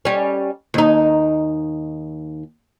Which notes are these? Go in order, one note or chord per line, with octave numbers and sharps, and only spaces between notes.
G3 C#4
D#2 D#4